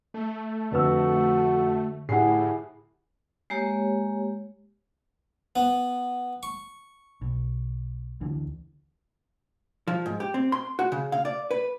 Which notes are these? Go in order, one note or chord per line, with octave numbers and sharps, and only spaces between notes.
A3
F2 D3 F#4 B4 E6
A2 E4 G4 G#4 F#5 C7
G#3 A#3 G4 C#5
B3
C#6
B1
D2 D3 E3
F3
G#2
G4
C4
C6
F#4
C#3
F5
D5
B4